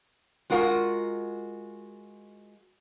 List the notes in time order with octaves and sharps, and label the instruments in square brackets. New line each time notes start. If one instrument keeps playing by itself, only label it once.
[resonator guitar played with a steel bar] G#3 F4 F#4 A#4